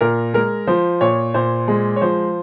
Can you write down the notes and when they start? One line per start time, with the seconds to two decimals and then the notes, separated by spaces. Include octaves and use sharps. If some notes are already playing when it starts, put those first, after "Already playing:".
0.01 A#2 A#4
0.34 G#3 A#4
0.67 F3 C5
1.01 A#2 C#5
1.34 A#2 C5
1.68 G#3
1.96 C#5
2.01 F3 C5